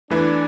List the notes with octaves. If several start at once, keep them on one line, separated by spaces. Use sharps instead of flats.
E2 E3 A3 D4 E4 B4